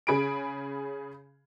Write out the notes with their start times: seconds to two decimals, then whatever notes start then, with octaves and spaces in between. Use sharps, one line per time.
0.07 C#3 G#4 B5 D7